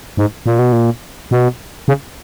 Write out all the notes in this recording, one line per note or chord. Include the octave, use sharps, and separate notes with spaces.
G#2
A#2
B2
A#2
B2
C#3